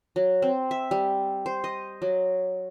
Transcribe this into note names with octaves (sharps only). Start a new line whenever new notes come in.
F#3
C4
E5
G3
C5
D#5
F#3